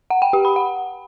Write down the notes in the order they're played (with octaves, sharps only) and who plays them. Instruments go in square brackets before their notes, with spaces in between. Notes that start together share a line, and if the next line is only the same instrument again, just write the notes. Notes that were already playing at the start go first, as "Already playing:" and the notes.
[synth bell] F#5
G5
G4
B5
F#5